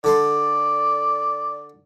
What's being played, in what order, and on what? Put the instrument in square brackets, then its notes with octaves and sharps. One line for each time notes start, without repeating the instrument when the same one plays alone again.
[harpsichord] D3 A4 C6 [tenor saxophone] D5